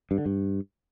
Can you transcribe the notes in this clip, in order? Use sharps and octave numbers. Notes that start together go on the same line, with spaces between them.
G2
D3
G2